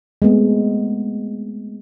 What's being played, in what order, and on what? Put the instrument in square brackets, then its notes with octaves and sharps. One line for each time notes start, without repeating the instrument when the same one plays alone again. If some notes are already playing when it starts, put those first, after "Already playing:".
[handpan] G#3 A3 B3 C4